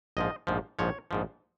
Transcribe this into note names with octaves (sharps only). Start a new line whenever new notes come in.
A#1 G#2 F3 D#5
A#1 G#2 F3
A#1 G#2 F3 C#5
A#1 G#2 F3